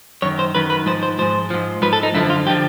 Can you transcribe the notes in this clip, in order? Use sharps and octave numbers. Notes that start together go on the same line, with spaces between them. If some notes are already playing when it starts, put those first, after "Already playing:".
F#2 D#3 C#5
C5
F#2 D#3 B4
B4
G#2 F3 C5
C5
G#2 F3 C5
G#2 F3
G#2 F3 B4
A4
D#4
F#2 D3 F3 E4
F4
D3 F3 G4